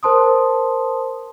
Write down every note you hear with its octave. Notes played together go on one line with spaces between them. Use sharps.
A#4 C5 A5 C6 D#6